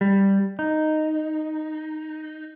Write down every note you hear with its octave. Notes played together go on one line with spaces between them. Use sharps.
G3
D#4